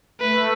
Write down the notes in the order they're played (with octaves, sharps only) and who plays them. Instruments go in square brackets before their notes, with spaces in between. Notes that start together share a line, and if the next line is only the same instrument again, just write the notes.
[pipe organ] A3 [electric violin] B4